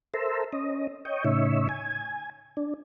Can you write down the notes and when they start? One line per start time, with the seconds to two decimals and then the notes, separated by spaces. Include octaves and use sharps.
0.14 A4 A#4 C5 E5
0.52 C#4 D#5
1.05 C#5 D#5 G5
1.24 A2 C#3 D#4 C#5 E5
1.69 G#5
2.57 D4